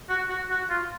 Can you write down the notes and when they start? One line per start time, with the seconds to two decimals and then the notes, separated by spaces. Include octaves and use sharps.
0.09 F#4
0.29 F#4
0.50 F#4
0.70 F4